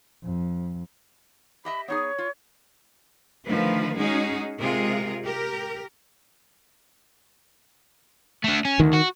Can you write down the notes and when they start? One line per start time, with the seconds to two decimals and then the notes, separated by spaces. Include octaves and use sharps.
0.23 F2
1.65 G4 D#5 E5 B5
1.88 B3 D#4 G#4 C#5
2.18 F4
3.46 D3 D#3 F3 A3 B4
3.97 G#3 C#4 D#4 F#4 G#4
4.60 C3 G#3 F4 G#4 A#4
5.24 G4 A#4
8.44 A3 D4
8.65 C#4
8.80 D2 D#3
8.93 F#4